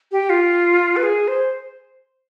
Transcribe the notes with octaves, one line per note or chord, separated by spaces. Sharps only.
G4
F4
B4
G#4
C5